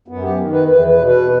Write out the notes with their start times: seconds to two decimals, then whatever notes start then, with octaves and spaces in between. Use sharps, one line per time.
0.08 F#2 B3
0.23 G4
0.38 D#3
0.53 B4
0.68 E2 B4
0.88 B4
0.97 B2
1.07 B4